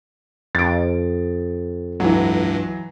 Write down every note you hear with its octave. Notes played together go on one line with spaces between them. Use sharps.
F2 A6 D7
C#2 G2 E3 F#3